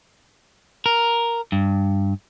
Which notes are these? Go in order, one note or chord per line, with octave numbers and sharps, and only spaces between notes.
A#4
G2